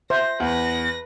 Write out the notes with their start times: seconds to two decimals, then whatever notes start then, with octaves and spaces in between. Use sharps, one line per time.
0.10 C5 E5 A#6
0.40 E2 B4 A#6